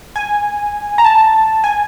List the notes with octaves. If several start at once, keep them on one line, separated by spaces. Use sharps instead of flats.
G#5
A#5
A5
G#5